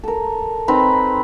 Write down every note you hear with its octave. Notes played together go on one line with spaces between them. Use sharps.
A4 A#4
C4 D#4 B4 A#5